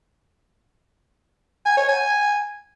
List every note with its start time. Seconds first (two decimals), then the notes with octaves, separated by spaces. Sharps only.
1.66 G#5
1.77 C#5
1.89 G#5